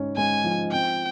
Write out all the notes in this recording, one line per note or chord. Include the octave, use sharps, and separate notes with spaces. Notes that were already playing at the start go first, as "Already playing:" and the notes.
Already playing: G#2 G#3 C#4
G#3 G#5
F3
C4 G5